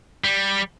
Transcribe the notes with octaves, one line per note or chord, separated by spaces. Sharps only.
G3